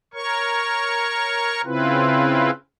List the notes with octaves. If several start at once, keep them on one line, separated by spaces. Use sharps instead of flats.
A#4 C#5 C#6
C#3 C4 E4 F4 B4